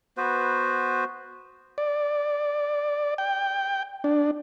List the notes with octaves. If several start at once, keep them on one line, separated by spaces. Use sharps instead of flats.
B3 F#4 B4 C5
D5
G5
D4